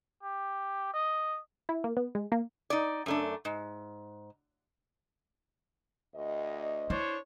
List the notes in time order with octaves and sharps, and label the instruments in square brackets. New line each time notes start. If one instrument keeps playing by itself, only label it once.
[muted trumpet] G4
D#5
[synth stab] E4
A#3
B3
G#3
A#3
[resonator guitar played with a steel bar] D#4 D5
F#2 A3 D4
G#2
[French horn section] D2 D#5
[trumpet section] D4 C5 C#5 [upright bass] E4